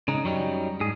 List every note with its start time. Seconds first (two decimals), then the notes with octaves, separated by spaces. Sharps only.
0.08 C#3 G#3 D#4
0.24 F#2 F#3 G3 D#4
0.80 G#2 G#4